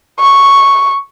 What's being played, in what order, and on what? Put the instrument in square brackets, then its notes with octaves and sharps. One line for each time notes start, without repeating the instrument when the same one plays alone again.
[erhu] C#6